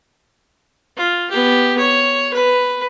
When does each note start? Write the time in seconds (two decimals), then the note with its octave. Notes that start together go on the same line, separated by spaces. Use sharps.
0.96 F4
1.30 B3 G4
1.79 C#5
2.33 B4